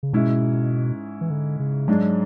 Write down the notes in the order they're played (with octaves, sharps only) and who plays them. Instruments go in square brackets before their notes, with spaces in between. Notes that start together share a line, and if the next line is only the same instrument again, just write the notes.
[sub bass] C#3
[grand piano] G#2 G#3 C#4 E4 [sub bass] B2
[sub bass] E3
D3
C#3
[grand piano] G#2 G#3 D4 [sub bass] F#3